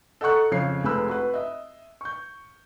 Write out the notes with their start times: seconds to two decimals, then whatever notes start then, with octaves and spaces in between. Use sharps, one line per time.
0.21 A4 D#5 F#5 A#5 C#6 F#6
0.51 F2 C#3 C#5 F5 C7
0.83 F1 G#3 B4 B5 E6
1.09 F#4 B4
1.34 D#5 E5
2.01 C#6 G6